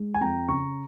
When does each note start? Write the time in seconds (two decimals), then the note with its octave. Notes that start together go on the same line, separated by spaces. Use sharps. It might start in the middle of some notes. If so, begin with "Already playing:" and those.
Already playing: G#3
0.14 G#5
0.21 F2 G5 A#5
0.48 C#3 A#5 C#6